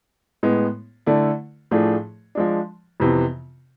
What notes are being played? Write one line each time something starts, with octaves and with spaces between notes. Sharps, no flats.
A2 G#3 B3
D3 A3 E4 A4 D5
A2 F3 A3 D4 G#4
F3 G#3 D4
F2 C3 E3 B3